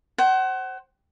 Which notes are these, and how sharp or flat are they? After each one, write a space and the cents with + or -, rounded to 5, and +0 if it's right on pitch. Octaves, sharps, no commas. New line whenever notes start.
C5 +20 F#5 +30